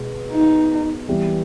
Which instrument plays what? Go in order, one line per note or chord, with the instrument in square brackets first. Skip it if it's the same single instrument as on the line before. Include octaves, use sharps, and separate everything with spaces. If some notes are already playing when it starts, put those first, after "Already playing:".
Already playing: [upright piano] B2 G#3 B3
[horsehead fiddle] D#4
[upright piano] E3 G3 B3 E4